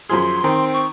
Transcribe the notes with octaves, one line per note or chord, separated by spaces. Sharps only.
F#2 F3 G#4 C6
D#3 C4
C#6